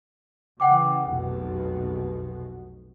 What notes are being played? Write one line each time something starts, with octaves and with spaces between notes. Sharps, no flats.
C#3 E3 F#5 G5 D6
F1 B1 B2 F#5